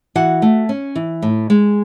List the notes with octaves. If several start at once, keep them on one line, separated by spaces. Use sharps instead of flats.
E3 F#4 F#5
A3
C#4
E3
A2
G#3